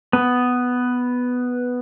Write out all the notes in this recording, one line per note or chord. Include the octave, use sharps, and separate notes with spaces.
B3